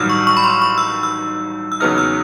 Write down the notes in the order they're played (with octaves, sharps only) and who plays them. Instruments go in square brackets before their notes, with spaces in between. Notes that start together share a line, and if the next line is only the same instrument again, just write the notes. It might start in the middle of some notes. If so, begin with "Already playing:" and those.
Already playing: [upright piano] A1 G2 D#3 F#3 [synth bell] E6 F6
[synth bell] C#6
C#6
B5
C6
C#6
E6
E6
E6
[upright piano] E2 C#3 F#3 B3 D#4 [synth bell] F6
[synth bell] E6